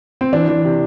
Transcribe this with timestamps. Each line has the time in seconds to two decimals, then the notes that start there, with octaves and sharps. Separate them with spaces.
0.21 C4
0.33 E3 D4
0.48 E3
0.65 C3